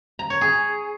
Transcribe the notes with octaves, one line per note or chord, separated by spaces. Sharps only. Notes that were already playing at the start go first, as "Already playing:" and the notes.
A#5
C#5
G#4